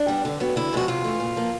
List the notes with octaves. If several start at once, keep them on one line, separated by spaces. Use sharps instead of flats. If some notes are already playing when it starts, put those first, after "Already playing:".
Already playing: D4
G3 B3
D3
F#3 B3
D3 E4
F3 G#3 B3 F#4
C3 F4
E3 A3
A#2
F3 A#3